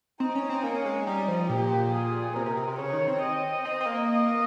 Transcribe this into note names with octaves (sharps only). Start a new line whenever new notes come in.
C4 D#4
C#4
C4
A#3 C#4
G#3
G3 D#4
F3
A#2 G4
G#4
C3 A#4
C3
C3
C3
C#3 C#5
D#3
C4
D#5
C4
C4
A#3
D#5